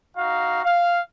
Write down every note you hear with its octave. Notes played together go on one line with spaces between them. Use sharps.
D#4 F#4 F5
F5